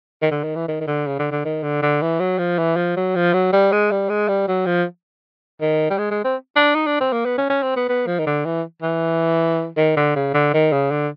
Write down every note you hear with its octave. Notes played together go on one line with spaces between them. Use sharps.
D#3
D3
D#3
E3
D#3
D#3
D3
C#3
D3
D3
D#3
D3
D3
E3
F#3
F3
E3
F3
F#3
F3
F#3
G3
G#3
G3
G#3
G3
F#3
F3
D#3
G3
G#3
G#3
C4
D4
D#4
D4
C4
A#3
B3
C#4
C#4
C4
B3
B3
F3
D#3
D3
E3
E3
D#3
D3
C#3
D3
D#3
C#3
D3